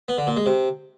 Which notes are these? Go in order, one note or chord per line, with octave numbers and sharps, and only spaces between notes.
B3
D3
A#2
G#3
C3